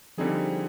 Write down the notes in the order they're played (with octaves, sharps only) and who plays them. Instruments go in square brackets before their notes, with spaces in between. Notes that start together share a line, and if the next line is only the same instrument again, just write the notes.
[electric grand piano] D3 G3 C4 D#4 G#4 [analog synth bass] F3